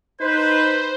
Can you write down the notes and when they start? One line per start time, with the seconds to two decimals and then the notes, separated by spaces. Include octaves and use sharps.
0.21 D#4 B4 C5 G6